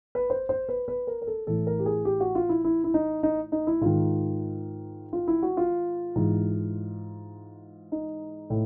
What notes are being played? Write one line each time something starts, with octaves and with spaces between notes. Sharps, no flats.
B4
C5
C5
B4
B4
A#4
A#4
A4
A2 E3 A4
A#4
G4
G#4
G4
F#4
F4
E4
E4
E4
D#4
D#4
D#4
E4
G#2 D#3 F4
F4
E4
F#4
F4
G#2 E3
D#4
A2